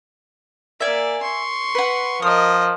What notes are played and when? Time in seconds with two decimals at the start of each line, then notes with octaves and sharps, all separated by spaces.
0.80 A#3 D5 E5 G#5
1.23 C6 C#6
1.75 B4 F#5
2.22 F3 A#4 D#5 D#6